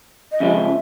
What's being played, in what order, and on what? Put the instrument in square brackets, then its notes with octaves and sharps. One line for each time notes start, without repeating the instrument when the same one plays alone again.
[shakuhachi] D#5
[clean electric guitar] F2 C#3 F3 G#3 [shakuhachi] E5